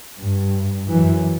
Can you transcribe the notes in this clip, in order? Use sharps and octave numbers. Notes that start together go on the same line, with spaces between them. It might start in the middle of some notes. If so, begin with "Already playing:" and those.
G2
F#2 E3